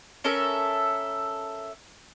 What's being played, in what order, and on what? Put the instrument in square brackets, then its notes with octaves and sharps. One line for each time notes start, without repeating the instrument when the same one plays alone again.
[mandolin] C#4 A4 A#4 E5